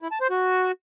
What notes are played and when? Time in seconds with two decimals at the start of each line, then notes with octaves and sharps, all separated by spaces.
0.02 E4
0.11 A5
0.21 C5
0.30 F#4